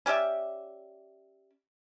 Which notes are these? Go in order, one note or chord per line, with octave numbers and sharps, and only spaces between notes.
C#4 G4 D5 E5